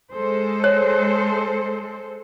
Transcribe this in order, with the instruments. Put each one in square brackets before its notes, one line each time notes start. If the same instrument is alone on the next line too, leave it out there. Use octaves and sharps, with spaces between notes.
[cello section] G#3 A4 C5
[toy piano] C#5